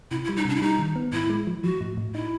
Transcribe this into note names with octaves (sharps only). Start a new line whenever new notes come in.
C3 E4
E4
G3
D#4
C3 D4
E4
G3 D#4
D#3
B3
A2 E4
G#3
F3
F3 F#4
A2
A2
D#4 E4